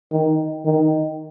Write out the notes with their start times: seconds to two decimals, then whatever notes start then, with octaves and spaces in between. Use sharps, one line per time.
0.12 D#3
0.65 D#3